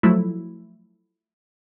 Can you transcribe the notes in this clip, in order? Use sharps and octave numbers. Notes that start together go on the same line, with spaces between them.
F3 F#3 A3 E4